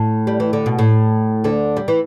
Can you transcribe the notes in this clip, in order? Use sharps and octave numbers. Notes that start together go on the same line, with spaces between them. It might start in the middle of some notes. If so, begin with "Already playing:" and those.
Already playing: A2
G3
E3
D3
B2
A2
D2 D3
G3
E3